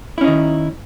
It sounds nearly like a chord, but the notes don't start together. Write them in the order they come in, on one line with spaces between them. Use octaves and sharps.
E4 C#4 D#4 D#3